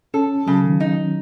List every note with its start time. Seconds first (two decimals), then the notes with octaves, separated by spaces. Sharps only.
0.14 C#4 A4
0.47 C#3 F#3
0.64 D#3
0.80 D#4